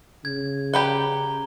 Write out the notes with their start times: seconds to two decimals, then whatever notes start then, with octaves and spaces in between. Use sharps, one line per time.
0.25 C#3 G#6
0.74 G4 B4 F#5 A#5 G7